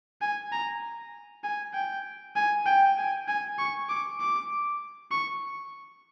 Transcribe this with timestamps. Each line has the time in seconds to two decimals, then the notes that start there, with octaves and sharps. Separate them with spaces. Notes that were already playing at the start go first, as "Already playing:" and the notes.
0.22 G#5
0.52 A#5
1.44 G#5
1.74 G5
2.36 G#5
2.67 G5
2.98 G#5
3.28 G#5
3.59 C#6
3.90 D6
4.20 D6
5.11 C#6